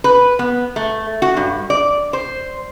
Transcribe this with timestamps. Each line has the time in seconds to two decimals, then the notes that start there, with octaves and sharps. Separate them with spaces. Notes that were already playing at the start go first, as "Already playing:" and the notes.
0.04 B4
0.39 B3
0.76 A3
1.22 F#4
1.37 G2
1.70 D5
2.13 C5